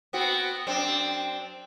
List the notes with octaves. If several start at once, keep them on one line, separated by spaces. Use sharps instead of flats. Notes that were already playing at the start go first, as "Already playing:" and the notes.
B3 C4 F#4
F#2 C4 D4